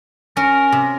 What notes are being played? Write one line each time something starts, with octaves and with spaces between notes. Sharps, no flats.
C#4 A#4
C3